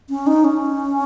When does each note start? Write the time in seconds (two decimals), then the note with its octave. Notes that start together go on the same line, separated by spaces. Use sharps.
0.09 C#4
0.27 D#4
0.44 C#4